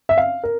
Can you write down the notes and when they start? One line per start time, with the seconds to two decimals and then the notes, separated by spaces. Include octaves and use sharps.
0.09 E5
0.18 F5
0.44 A#4